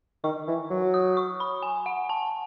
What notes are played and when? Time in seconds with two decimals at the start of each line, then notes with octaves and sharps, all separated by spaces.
0.24 D#3 C#6
0.48 E3
0.70 F#3
0.94 D#6
1.17 C#6
1.40 B5
1.63 G#5
1.86 F#5
2.09 A5